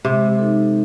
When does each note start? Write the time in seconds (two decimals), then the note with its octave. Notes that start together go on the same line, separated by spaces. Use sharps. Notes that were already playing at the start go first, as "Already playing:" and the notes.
0.05 C3 G#3
0.39 D#4 A4